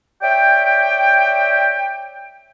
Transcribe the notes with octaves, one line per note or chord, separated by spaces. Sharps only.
C#5 D5 E5 G5